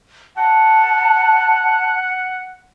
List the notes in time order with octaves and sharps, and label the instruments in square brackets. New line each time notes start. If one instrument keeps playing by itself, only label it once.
[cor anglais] F#5 [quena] A5